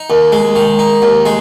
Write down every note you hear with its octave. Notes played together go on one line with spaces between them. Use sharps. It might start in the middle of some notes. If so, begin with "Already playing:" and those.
Already playing: D#4
D#2
G#3
D#3
D#4
D#2
G#3